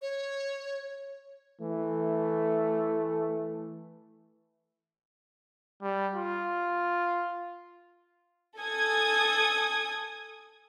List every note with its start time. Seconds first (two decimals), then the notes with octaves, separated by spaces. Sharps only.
0.02 C#5
1.61 E3 A3
5.82 G3
6.15 F4
8.58 A4 G#5 D#6 G#6